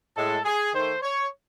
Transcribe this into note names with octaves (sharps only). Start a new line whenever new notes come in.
A2 G#3 A4
G#4
D#3 A3 C5
C#5